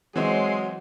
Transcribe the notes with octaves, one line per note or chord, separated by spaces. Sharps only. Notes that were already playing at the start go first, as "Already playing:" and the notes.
E3 F#3 G#3 C4 C#5 C6